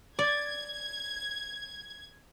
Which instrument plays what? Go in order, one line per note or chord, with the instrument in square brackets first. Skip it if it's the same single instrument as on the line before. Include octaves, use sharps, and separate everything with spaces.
[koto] D5 [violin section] G#6